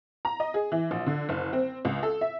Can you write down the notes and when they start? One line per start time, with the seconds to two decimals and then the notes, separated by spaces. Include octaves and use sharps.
0.25 A#5
0.40 D#5
0.54 G#4
0.72 E3
0.91 A#1
1.06 D3
1.29 F#1
1.53 C4
1.85 C#2
2.03 A4
2.21 E5